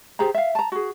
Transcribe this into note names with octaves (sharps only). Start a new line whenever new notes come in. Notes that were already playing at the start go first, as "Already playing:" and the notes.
G4 G#4 C5 A#5
E5 F5
A5 A#5
F#4 G#4